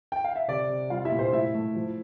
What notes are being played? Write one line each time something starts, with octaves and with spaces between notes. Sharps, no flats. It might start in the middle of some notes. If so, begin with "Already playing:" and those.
G5
F5
E5
C3 D5
C3
G3 F4 F5
E4 E5
A#2
C5
A2 E4 E5
A3
F3